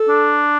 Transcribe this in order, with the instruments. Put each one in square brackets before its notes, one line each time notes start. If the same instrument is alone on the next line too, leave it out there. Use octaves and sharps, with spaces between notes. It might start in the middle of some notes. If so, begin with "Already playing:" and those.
Already playing: [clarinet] A4
[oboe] D4